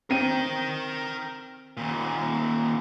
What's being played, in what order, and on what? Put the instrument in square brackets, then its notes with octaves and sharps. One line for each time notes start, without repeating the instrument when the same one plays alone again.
[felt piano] C4 D#7 [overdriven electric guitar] A#4 G5
[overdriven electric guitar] D#2 A#2